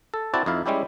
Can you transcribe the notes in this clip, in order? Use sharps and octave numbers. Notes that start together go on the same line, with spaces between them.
A4
C4 E4 F#4 D5 A5
F2 D#4 E4 F5
G3 G#3 C#4 E4 G4